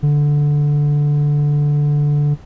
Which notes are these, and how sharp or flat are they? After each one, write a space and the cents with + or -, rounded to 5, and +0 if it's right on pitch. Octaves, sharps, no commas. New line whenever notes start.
D3 -5